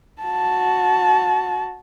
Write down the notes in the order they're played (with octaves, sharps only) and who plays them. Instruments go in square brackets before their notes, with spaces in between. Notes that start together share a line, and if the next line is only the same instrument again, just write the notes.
[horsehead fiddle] F#4 A5